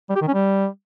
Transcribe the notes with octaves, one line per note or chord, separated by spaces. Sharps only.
G3
G4
D#3
C#4
G3